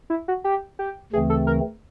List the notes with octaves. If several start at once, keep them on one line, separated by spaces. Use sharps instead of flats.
E4
F#4
G4
G4
D2 C#3 E3 A3 C4 G#4
A4
A#4